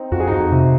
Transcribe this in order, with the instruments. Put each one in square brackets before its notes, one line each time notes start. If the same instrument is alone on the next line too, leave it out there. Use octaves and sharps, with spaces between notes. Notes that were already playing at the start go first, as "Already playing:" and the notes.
Already playing: [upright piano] C4 D#4
[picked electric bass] F2 [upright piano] F#4
[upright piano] G#4
[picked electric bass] F2 [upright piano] D#4 F#4
[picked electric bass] C3